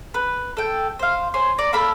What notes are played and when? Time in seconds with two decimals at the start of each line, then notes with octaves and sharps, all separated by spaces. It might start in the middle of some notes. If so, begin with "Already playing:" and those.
0.14 B4
0.57 A4 G5
0.99 C5 F5
1.34 C5 C#5 G#5
1.58 D5 A#5
1.73 A#3 A4 B5